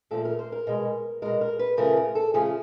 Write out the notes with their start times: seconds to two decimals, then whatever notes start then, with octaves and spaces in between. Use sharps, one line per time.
0.11 A#2 F3 A3 A4
0.25 A#4
0.39 C5
0.52 A#4
0.67 B2 G#3
1.22 B2 G#3 A#4
1.41 A#4
1.59 B4
1.77 C#3 F3 A3 A#4
1.97 A#4
2.15 A4
2.34 C#3 F3 A3 G#4